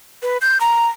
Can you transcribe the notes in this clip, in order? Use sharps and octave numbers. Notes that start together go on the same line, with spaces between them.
B4
G6
A#5